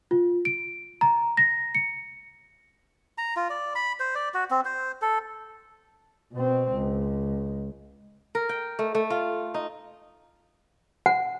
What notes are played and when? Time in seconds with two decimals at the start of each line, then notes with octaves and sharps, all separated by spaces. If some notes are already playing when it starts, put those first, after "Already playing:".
0.11 F4
0.45 D7
1.01 A#5
1.37 A#6
1.75 C#7
3.18 A#5
3.36 F4
3.50 D5
3.75 B5
4.00 C5
4.15 D5
4.34 F#4
4.51 C4
4.65 C5
5.02 A4
6.33 B2 C4
6.73 C#2
8.35 A#4
8.49 G5
8.79 A3
8.95 A3
9.10 F4
9.54 D#4
11.06 F#5